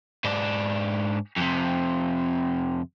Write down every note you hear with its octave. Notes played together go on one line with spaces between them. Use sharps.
G#2 D4
F2 C3